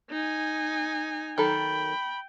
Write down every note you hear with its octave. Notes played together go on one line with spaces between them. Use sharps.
D#4 G#5
D#3 F#3 A4 G5 B5